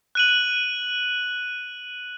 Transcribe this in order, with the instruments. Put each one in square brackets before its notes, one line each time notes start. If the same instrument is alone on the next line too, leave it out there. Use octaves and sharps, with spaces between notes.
[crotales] F#6 D#7 F#7